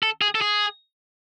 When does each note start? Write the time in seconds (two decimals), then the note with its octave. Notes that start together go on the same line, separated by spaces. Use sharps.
0.03 A4
0.22 G#4
0.35 A4
0.41 G#4